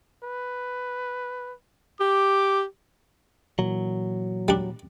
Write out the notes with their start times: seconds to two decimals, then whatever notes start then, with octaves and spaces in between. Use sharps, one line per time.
0.24 B4
2.00 G4 D6
3.59 A#2 E3 F#3
4.48 G3 D4